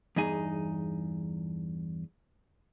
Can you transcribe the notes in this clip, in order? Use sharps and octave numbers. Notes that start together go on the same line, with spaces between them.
E2 G2 D#4 G#4